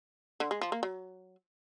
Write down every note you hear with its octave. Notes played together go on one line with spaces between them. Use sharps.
D3
G#3
F3
A#3
F#3